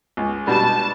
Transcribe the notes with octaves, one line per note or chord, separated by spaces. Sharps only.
C#2
B2 G3 D4 F#4 A5